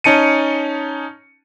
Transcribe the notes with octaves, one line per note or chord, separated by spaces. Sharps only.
C#4 D#4 A5 C#7 D#7